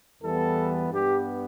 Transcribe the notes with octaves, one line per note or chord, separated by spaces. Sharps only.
E2 E3 G3 B3 A4
G2 G3 B3 G4